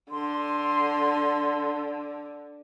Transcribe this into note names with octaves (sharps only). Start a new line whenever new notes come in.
D3 C6